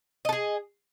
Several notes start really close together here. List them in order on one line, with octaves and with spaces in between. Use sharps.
D#5 A4 G#4